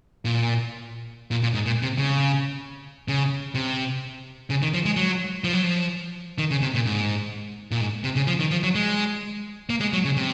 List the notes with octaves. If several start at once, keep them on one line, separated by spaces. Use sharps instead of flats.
A#2
A#2
A#2
G#2
A#2
C3
C#3
C#3
C3
C#3
D#3
F3
G#3
F#3
F3
F#3
F3
D#3
C#3
C3
A#2
G#2
A#2
G#2
C3
C#3
F3
D#3
F3
F#3
G#3
A#3
G#3
F#3
C#3
C3